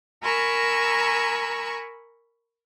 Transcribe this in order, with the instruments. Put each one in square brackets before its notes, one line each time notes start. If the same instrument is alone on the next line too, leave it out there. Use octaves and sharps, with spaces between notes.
[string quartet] A#4 G#5 A#5 B5 C#6 E6